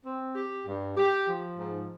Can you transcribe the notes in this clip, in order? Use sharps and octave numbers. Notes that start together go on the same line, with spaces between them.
C4
G4
G2
G4
F3
G#2